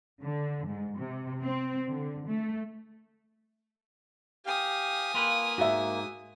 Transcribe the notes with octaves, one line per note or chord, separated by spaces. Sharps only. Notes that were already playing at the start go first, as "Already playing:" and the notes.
D3
G#2
C3
C4
D3
A3
G4 F5 G#5 D#6
A#3 F4 B4
G#2 F#4 E5